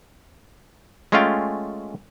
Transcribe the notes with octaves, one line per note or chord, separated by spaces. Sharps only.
G#3 A3 C#4 F4 F5 G5